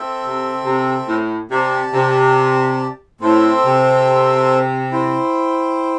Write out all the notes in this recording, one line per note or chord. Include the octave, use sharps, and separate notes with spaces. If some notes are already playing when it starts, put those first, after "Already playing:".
Already playing: C4 A4 E5 G5
C3
C3
A2
C3 G4 D5 A5
C3
A2 C4 A4 C5 E5 G5
C3
E4 C5 G5